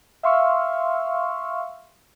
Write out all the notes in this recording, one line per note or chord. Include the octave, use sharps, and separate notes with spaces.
E5 F5 C6 C#6 E6 F6